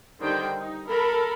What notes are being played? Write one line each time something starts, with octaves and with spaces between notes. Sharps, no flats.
D3 D#3 G3 C5 G5
D#4
A4 A#4 B5